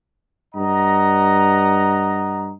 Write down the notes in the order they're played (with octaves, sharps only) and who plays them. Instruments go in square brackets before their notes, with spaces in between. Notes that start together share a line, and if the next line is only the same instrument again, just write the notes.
[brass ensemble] G2 D#5 F#5 A#5